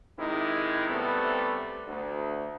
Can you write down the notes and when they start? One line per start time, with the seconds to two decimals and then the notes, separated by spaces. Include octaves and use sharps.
0.19 C3 D#3 G#3 D#4 E4
0.89 C3 G3 A3 B3
1.88 D2